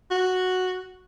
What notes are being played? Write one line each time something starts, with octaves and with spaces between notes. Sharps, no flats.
F#4